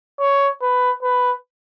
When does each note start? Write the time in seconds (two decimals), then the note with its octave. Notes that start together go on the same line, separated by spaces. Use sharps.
0.20 C#5
0.62 B4
1.03 B4